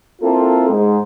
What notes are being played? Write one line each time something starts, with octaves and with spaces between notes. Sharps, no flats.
A#3 C4 E4 F4 A4
G#2 G#3